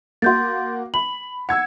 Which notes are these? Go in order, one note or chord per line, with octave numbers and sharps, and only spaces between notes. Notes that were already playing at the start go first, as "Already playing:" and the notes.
A#3 F#4 C6 G6 A6
B5 F#7
F#5 E6 G#6 C#7